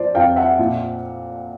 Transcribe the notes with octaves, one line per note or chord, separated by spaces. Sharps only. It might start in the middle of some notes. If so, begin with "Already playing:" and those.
Already playing: F3 C5 D5
F2 F5 G5
E5 F#5
A#2